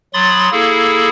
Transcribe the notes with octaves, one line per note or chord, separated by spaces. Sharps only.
F#3 B5 C6 D#6 A6
A#3 E4 G#4 A4